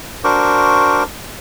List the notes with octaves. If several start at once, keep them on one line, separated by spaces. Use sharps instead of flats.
D4 F#4 A#4 C5 C#6 D6